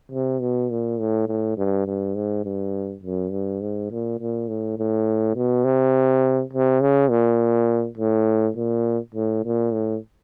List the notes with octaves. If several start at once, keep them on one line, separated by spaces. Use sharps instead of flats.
C3
B2
A#2
A2
A2
G2
G2
G#2
G2
F#2
G2
G#2
A#2
A#2
A2
A2
B2
C3
C3
C#3
A#2
A2
A#2
A2
A#2
A2